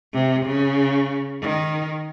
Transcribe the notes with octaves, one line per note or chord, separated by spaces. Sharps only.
C3
C#3
D#3